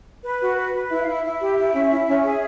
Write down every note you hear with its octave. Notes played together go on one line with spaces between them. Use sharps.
B4
F#4
B4
B4
E4 E5
F5
E4
E5
E4
G4
E4
C#4
E4
C#4
G#4